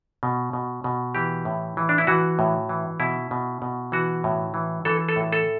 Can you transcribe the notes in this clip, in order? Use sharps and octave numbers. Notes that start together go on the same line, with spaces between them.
B2
B2
B2
E3 G4
A2
E3
D4
E4
E3 F#4
A2
E3
B2 E4
B2
B2
E3 F#4
A2
E3
E3 A4
A4
A2
A4